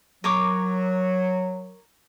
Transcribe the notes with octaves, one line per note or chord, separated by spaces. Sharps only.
F#3 A#4 C#5 D6